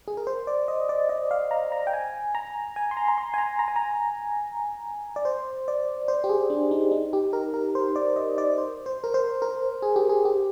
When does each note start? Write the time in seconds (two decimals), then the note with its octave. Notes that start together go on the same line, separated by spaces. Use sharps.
0.08 G#4
0.17 A#4
0.27 C5
0.47 D5
0.68 D#5
0.89 D5
1.09 D#5
1.31 F5
1.51 A#5
1.72 A#5
1.87 G5
1.93 G#5
2.35 A#5
2.76 G#5
2.91 C6
2.97 A#5
3.08 A#5
3.18 C6
3.34 G#5
3.38 A#5
3.59 A#5
3.68 G#5
3.76 A#5
5.16 D5
5.25 C5
5.68 D5
6.08 C5
6.24 G4
6.29 G#4
6.50 D4
6.71 D#4
6.91 D#4
7.13 G4
7.33 A#4
7.54 A#4
7.75 C5
7.96 D5
8.16 D#5
8.38 D5
8.58 C5
8.86 C5
9.04 A#4
9.14 C5
9.42 A#4
9.82 G#4
9.96 G4
10.09 G#4
10.25 G4